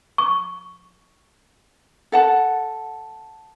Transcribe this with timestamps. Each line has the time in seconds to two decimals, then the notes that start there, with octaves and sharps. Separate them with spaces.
0.18 C#6
2.12 A4 F#5 A5